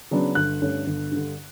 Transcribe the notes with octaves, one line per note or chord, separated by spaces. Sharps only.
C#3 F#3 B3 D4
G1 F#6
G2 D3 A3 C#4
G1
G2 D3